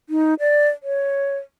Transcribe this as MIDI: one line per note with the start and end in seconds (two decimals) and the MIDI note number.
0.09 0.34 63
0.40 0.69 74
0.83 1.37 73